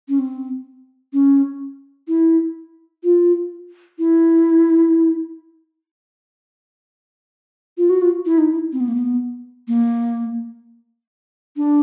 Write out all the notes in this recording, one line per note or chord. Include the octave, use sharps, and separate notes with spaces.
C#4
C4
C#4
E4
F4
E4
F4
F#4
F4
E4
D#4
E4
C4
B3
A#3
B3
A#3
D4